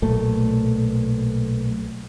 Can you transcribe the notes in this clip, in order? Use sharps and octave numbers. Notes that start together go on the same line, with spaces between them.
B1 A#2 A3